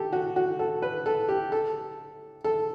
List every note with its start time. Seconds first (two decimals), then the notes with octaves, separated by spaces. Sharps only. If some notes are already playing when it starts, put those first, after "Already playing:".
Already playing: G4 A4
0.13 F#4
0.36 F#4
0.59 A4
0.82 B4
1.06 A4
1.29 G4
1.52 A4
2.44 A4